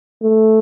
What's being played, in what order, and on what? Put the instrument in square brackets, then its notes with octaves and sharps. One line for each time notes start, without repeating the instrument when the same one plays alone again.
[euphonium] A3